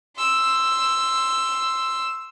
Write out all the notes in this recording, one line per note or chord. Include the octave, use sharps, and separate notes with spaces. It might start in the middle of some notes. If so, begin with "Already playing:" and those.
C6 E6